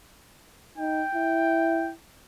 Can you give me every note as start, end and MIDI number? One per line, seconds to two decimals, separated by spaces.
0.78 1.03 63
0.78 1.91 79
1.15 1.94 64